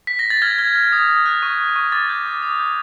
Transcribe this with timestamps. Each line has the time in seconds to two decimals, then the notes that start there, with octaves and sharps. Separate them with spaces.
0.07 B6
0.19 A#6
0.30 A6
0.42 F6 G#6
0.58 F6 G#6
0.75 F6
0.92 D#6
1.09 D#6
1.26 F#6
1.42 C#6
1.58 C#6
1.76 C#6
1.92 D6 A6
2.09 G6
2.26 D6
2.42 D#6
2.59 G6